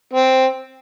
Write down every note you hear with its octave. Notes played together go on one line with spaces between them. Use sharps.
C4